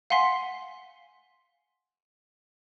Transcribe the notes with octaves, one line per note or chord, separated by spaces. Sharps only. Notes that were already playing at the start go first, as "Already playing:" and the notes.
F5 F#5 G#5 C6 B6 C7